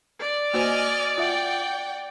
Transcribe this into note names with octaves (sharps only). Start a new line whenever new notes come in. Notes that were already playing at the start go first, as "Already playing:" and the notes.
D5
A#3 F#4 C5 D#5 G#5 F6
F4 E5 F#5 G5